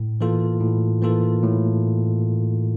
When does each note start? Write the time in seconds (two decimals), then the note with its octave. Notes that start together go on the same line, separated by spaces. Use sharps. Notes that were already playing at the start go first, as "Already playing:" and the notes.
Already playing: A2
0.21 E3 A#3 F4 A4
0.61 A2
1.02 E3 A#3 F4 A4
1.43 A2